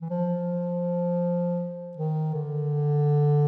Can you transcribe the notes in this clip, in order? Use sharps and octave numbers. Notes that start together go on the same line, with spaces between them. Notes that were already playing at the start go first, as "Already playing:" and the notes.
E3
F3
D#3
D3